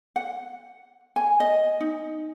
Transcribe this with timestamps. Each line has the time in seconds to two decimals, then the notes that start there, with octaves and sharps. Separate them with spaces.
0.16 F#5
1.16 G#5
1.40 D#5
1.80 D#4